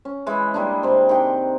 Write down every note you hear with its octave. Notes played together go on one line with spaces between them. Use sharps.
C#4
E3 G#3 E4
G3 G#3 A#3 D4
C3 C4
D#3 G5